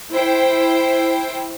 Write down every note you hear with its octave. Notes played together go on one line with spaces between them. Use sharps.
E4 C5 G5